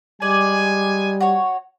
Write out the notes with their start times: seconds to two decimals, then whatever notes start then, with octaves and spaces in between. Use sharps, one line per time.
0.22 G3 G#3 D5 G#5
1.21 F#4 C#5